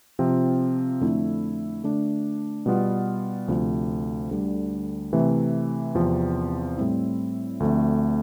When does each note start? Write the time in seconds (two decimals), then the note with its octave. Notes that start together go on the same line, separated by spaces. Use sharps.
0.19 C3 F3 C4 F4
1.01 F2 D3 A3 E4
1.84 D3 A3 D4
2.66 B2 G3 B3 F4
3.48 D2 C3 F3
4.31 D2 D3 G3 D4
5.13 C3 E3 A3
5.95 E2 C3 F3 C4
6.78 A2 G3 C4 E4
7.60 D2 D3 F3 A3 C4